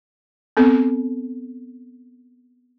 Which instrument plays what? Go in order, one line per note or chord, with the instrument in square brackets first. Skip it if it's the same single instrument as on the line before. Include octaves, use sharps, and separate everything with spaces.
[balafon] B3 C4 A4